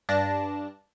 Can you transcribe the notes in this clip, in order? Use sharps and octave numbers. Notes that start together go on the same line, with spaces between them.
G2 D4 A5 A#6